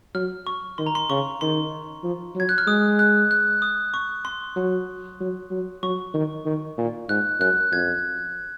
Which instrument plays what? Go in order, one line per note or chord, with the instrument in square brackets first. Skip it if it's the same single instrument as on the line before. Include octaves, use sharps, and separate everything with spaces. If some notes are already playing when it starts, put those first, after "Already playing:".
[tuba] F#3 [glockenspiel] F6
[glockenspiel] C#6
[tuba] D#3 [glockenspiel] C6
[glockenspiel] A#5
C6
[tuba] C#3 [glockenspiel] C#6
[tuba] D#3 [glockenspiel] C6
[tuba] F3
F#3
[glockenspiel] G#6
F#6
F6
[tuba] G#3 [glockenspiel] D#6
[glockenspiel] F#6
F#6
D#6
C#6
C6
[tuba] F#3
F#3
F#3
[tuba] F#3 [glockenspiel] C#6
[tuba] D#3
D#3
A#2
[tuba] G#2 [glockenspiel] F#6
[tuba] F#2 [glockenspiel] F#6
[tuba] F2 [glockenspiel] G#6